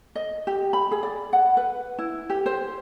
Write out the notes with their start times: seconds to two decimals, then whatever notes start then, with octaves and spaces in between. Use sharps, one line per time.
0.15 D#5
0.47 G4
0.73 B5
0.91 G#4
1.03 D5
1.33 F#5
1.57 B4
1.99 E4
2.30 G4
2.46 C5